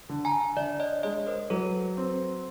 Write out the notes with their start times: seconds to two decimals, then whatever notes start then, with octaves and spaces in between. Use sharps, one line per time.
0.09 D3
0.25 G#5 A#5
0.57 D3 D5 E5
0.80 C#5 D#5
1.03 G#3 C#5 D#5
1.27 A#4 C5
1.50 F#3 A4 B4
1.97 C4